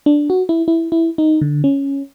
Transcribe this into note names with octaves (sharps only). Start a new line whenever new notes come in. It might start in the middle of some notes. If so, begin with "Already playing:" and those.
D4
F#4
E4
E4
E4
D#4
D3
C#4